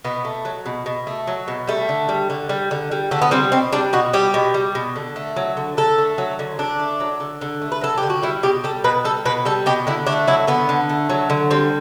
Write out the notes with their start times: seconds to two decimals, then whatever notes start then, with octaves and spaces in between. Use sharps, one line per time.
0.04 B2 B3
0.25 A3
0.45 F#3
0.66 B2
0.86 B2
1.07 A3
1.27 F#3
1.48 B2
1.68 G3 A3
1.89 D3
2.09 G3
2.30 D3
2.49 G3
2.71 D3
2.91 G3
3.11 D3 A3
3.22 B3
3.31 G3 C4
3.52 B2 C4
3.73 G3 D4
3.93 B2 F#4
4.13 G3 G4
4.34 B2
4.54 G3
4.75 B2
4.96 D3
5.16 A3
5.36 F#3
5.57 D3
5.77 D3 A4
5.98 A3
6.18 F#3
6.39 D3
6.59 D3 D4
6.80 A3
7.00 F#3
7.20 D3
7.41 D3
7.62 A3
7.72 B4
7.81 F#3 A4
7.98 G4
8.03 D3
8.10 F#4
8.23 G3 E4
8.43 B2 G4
8.64 G3 A4
8.84 B2 B4
9.05 G3 A4
9.25 B2 B4
9.45 G3 A4
9.66 B2 G4
9.87 D3 E4
10.07 A3 D4
10.27 F#3 E4
10.47 D3 B3
10.69 D3
10.89 A3
11.09 F#3
11.30 D3
11.51 G3 C4